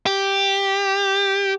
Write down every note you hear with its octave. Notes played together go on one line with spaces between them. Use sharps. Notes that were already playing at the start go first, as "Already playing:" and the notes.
G4